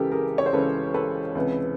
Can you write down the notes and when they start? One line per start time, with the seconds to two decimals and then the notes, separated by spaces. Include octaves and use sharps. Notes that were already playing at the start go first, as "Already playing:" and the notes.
Already playing: C#2 C#3 E3 G4 A4 A#4
0.12 G#4 A#4
0.38 C#5
0.46 C5
0.53 C#2 C#3 E3 A4 B4
0.94 A4 B4
1.35 C#2 C3 E3